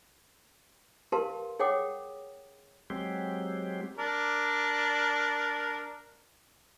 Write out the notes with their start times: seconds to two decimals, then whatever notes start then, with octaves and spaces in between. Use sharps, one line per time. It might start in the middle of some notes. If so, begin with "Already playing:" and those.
1.12 G4 A#4 B4 F5 A5 C6
1.59 G#4 C#5 F#5 G5 D6 D#6
2.90 F#3 G#3 C4 G4
3.98 D4 A#4